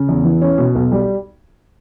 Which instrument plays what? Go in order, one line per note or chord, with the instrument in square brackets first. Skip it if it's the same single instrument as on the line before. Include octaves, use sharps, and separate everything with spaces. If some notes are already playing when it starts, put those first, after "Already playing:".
Already playing: [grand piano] C#3
E2
E3
C#4
B2
B1
G3